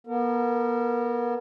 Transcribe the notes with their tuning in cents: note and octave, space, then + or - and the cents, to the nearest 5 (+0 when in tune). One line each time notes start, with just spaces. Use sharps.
B3 -40 A#4 -30